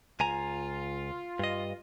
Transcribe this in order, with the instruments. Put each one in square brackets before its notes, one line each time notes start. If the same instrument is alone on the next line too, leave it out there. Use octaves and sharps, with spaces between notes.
[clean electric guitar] C#2 G#5 A#5 [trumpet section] F4
[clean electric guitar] G2 D#5